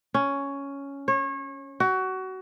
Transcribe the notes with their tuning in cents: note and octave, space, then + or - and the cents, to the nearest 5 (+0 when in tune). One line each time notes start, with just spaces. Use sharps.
C#4 +5
C#5 -30
F#4 +25